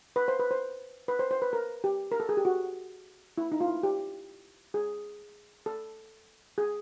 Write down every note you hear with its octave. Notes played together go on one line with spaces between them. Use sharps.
B4
C5
B4
C5
B4
C5
C5
B4
A#4
G4
A#4
A4
G#4
G4
F#4
E4
D#4
F4
E4
G4
G#4
A4
G#4